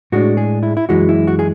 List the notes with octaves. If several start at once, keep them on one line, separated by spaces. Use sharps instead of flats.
A2 G#3 D4 F#4
G#4
E4
E4
F#2 E3 G#3 F#4
E4
F#4
G#4